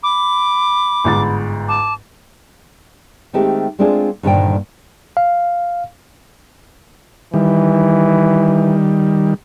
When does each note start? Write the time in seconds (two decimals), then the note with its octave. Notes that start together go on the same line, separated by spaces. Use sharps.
0.03 B5 D6
1.04 G1 G#2 A6
1.68 A5 D6
3.33 D#3 G#3 A3 C4 G4
3.79 G#3 A3 C4 D4 F4 G#4
4.23 G2 A#2 D3 D#3 C5 G5
5.17 F5
7.34 D#3 E3 G3